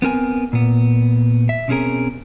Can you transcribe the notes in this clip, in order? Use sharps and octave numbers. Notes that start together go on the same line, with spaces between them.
B3 C4 A#4 G#5
A#2 B3
E5
B2 C4 C#4 G#4 A#4